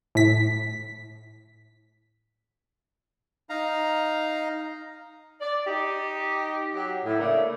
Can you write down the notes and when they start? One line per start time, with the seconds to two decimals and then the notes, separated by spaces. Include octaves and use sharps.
0.15 A2 B6
3.50 D#4 F5 A#5
5.41 D5
5.66 D#4 G4
6.74 F#3 G4
7.05 A2
7.19 C#3 A3 A#3 D4